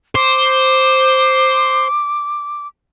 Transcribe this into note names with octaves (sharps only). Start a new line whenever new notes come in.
C5 D6